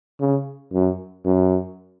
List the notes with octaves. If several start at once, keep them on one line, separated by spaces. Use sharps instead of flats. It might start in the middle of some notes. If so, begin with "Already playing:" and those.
C#3
F#2
F#2